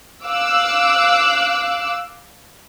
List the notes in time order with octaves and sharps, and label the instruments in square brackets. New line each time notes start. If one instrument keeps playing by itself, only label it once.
[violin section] F5 D6 E6 F#6